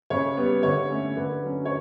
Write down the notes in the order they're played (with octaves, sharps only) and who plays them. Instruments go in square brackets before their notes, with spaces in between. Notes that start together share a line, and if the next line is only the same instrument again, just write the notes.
[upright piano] C#3 C#5
G3 B3
D3 C#5
A3 C#4
D3 B4
F#3 C#4
C#5